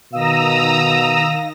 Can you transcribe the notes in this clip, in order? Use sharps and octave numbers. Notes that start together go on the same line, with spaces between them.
B2 D#3 F5 A#5 D#6 E6 A#6